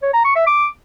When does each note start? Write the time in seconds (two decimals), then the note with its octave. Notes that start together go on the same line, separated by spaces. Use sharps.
0.02 C#5
0.14 A#5
0.25 C#6
0.36 E5
0.47 D6